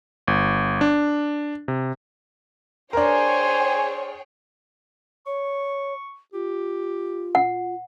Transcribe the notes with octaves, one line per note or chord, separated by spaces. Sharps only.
G1
D4
C3
D4 G#4 A#4 C5 C#5 G5 G#5
C#5 C#6
F4 G4
F#5